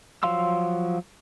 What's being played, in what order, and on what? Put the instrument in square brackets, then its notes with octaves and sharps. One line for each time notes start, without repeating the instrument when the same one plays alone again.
[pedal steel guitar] F3 F#3 F5 C6 E6